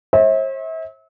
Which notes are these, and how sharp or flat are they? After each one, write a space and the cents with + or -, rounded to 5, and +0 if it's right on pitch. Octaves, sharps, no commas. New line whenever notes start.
C5 +45 E5 -35